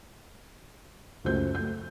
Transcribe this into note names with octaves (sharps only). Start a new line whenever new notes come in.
C#2 F#2 A3 C5 G6
A3 G6